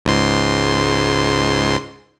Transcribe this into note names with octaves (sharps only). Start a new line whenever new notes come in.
C#2 G#2 C6